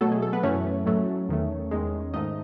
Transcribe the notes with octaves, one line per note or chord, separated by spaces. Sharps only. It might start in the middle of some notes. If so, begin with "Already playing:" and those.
B2 F#3 A3 A4
G#4
A4
B3 B4
F#2 E3 A3 C#4 C#5
A2 F#3 A3
E2 D#3 A3
E2 D#3 G#3
G#2 D#3 A3 D#4 D#5